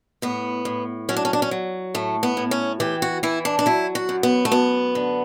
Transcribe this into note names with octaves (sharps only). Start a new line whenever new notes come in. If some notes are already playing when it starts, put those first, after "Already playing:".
A2 B3
A2
F#3 C#4
D4
C#4
D4
C#4
F#3
A2 A3
B3
A2
C#4
E3 G4
F#4
E3 E4
D4
D4
F#3 E4
F#4
F#2
B3
A3
F#2 B3
D3